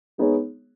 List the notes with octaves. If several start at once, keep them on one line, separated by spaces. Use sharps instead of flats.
G#3 B3 D#4 G#4 C#5